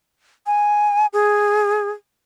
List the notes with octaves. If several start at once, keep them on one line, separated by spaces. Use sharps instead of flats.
G#5
G#4